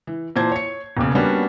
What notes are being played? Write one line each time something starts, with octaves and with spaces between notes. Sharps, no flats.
E3
A#2 E3 C5 A5 G#6
C#5 C#7
E1 D#2 C#3
G3 A#3 B3 C#4 D4 F#4